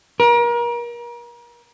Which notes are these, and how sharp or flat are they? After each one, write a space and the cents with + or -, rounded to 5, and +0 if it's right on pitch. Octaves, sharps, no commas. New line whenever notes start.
A#4 +35